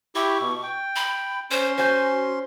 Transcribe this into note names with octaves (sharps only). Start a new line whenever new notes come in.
E4 G4 C#6
B2
G5
B5
C#4 C5 C6
F#4 C5 G#5 G6